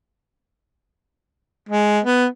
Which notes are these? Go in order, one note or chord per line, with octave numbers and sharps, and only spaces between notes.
G#3
B3